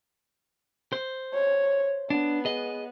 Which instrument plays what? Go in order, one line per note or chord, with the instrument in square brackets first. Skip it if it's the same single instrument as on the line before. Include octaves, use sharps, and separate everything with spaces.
[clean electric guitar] C5
[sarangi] C#5
[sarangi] B3 [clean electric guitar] D4
[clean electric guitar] G#4 D#5